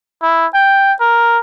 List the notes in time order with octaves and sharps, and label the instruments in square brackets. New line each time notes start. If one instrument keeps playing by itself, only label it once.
[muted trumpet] E4
G5
A#4